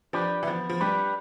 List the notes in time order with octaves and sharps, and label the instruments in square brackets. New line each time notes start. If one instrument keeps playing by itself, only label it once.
[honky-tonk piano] F3 [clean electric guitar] D4 G4 B4
[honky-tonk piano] E3
[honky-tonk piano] F3 [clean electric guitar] B3
[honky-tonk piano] F3
[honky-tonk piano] G3 [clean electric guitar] D4 G4 B4